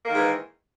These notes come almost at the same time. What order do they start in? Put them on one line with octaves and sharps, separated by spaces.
A#3 D#3 G#2 E3